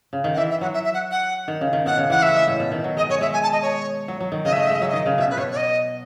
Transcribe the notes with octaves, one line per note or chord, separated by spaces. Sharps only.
C#3
D#3
F#5
E3 E5
E5
F#3 F#5
E5
E5
F#5
F#5
D#3
C#3
D#3
B2 F#5
C#3
E3 F#5
A3 E5
G#3
A2
B2
D#3
F#3
G#3 D#5
G#3 C#5
G#3 E5
G#5
A5
D#5
C#5
F#3
F#3
D#3
C#3 D#5
E5
A3 D#5
E5
G#3 D#5
F#3 E5
D#5
D#3
C#3
B2 E5
B4
B2 C#5
C#5
D#5